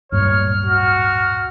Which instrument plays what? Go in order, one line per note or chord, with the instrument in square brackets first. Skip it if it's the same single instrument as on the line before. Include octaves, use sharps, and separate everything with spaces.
[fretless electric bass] D1 G2 A#2 [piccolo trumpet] C#5 [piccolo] F6
[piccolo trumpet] F#4